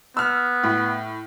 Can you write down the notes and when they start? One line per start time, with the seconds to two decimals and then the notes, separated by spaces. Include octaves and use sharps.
0.17 B3 E6 F6
0.63 A2